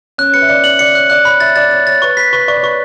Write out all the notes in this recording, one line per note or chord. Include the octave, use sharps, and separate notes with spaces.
C#4 F#6
B4 C#7
E5
D5 C#7
D5 F#7
D5 C#7
C#5 F#6
D5 F#6
C#5 B5
E5 A6
D5 A6
C#5 A6
C#5 A6
B4 C#6
B4 B6
B4 C#6
D5 C#6
C#5
B4 C#6